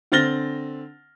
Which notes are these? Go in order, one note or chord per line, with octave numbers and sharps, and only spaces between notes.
D3 C4 F6 A6 A#6 G7